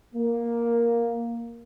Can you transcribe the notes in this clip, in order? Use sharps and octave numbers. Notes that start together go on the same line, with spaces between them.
A#3